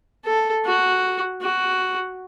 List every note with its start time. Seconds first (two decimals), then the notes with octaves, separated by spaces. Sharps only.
0.25 A4
0.65 F#4
1.42 F#4